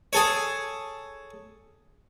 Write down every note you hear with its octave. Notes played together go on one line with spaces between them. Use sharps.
G#4 A4 C#5